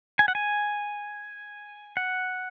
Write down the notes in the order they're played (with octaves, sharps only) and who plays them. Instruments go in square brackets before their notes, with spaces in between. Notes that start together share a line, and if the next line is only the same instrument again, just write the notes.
[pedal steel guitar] G#5
F#5
G#5
F#5